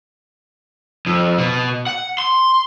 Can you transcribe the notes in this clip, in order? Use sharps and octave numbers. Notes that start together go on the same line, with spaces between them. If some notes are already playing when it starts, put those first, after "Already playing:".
F2
B2
F#5
C6